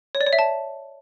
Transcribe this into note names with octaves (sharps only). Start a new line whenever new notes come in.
C#5
D5
C#5
E5
A5